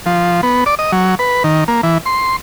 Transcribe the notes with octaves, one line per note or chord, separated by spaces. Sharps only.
F3
B3
D5
D#5
F#3
B4
D#3
A#3
E3
C6